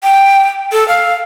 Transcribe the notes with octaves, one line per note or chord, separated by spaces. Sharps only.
G5
A4
F5